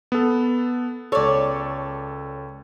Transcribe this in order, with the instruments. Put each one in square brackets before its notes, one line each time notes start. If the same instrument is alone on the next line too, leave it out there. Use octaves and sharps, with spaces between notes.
[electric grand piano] B3 A4
[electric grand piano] C#2 A4 [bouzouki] C#5 D5